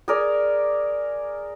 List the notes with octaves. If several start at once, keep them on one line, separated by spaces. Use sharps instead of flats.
G#4 A#4 D5